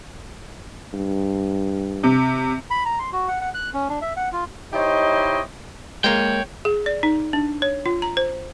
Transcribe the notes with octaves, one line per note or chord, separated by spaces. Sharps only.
G2
C3
B5
A#5
C6
F#4
F#5
F#5
F#6
C#4
D4
E5
F#5
F4
D#4 E4 G4 C5 C#5 D#5
G#3 A#3 C#5 G5
G#4
D5
D#4
D4
C#5
F4
A#5
C5